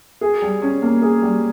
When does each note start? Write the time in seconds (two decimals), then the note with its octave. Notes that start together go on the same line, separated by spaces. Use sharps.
0.21 G#4
0.42 G3
0.62 C#4
0.82 A#3
1.02 G#4
1.22 G3